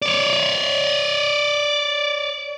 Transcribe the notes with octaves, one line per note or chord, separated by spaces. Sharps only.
C#5 D5